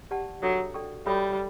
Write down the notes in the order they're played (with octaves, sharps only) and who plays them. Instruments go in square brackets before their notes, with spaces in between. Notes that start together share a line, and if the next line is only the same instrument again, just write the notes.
[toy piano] G4 D5 F#5 A5
[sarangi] F#3 [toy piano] D4 A4 C#5 E5
[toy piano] A4 D5 G5 C#6
[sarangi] G3 [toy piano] F#4 A4 C#5 E5 B5